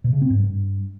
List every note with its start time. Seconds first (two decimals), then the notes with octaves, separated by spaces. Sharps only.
0.04 B2
0.13 C#3
0.22 C4
0.30 G#2
0.39 G2